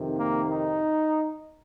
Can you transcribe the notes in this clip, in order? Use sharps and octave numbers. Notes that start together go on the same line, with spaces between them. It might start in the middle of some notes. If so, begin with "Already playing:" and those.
Already playing: F2 C3 D#3
A#3
D#4